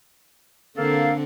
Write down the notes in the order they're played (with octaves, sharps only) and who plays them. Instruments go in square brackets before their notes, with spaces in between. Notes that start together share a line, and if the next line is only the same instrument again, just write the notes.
[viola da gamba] D3 C4 [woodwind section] A#3 A4 F5